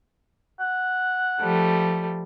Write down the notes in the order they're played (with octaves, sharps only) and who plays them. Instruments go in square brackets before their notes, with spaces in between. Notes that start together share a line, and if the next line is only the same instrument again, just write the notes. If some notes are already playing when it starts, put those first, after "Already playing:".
[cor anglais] F#5
[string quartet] F3 G3 A3